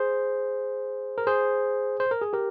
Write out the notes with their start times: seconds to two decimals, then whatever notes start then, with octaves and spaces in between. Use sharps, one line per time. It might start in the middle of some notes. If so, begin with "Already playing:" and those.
Already playing: G#4 C5
1.18 A#4
1.27 G#4 C5
2.00 C5
2.11 A#4
2.22 G#4
2.33 G4 A#4